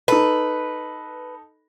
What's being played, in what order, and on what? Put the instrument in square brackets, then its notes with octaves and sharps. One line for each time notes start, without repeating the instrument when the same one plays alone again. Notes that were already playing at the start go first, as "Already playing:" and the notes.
[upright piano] D#4 A4 [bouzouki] B4